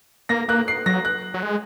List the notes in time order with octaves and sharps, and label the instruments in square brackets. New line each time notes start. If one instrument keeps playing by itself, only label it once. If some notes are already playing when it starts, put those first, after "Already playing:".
[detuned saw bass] A#3 [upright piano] A#6
[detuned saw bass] A#3 [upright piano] F#6
[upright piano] C7
[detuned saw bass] F#3 [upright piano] A#6
[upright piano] F#6
[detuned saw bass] F#3
G#3